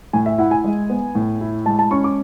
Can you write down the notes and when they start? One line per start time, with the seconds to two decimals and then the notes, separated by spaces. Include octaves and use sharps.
0.13 A2 G#5
0.26 E5
0.38 E4 F#5
0.51 G#5
0.64 G#3
0.90 B3
1.15 A2
1.41 E4
1.66 G#3 A5
1.79 A5
1.91 C#4 C#6
2.04 D6